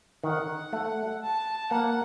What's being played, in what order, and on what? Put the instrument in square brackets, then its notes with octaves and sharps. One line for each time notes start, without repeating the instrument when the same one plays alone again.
[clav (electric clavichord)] D#3 [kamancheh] F#5
[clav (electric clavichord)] A3
[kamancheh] A5
[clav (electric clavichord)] A#3 [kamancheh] F#5